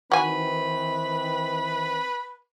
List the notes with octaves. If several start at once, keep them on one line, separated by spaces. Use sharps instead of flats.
D#3 E3 C4 F#4 B4 G#5